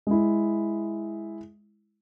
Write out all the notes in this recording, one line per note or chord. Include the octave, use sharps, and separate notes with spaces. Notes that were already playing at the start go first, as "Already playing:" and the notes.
G#3 E4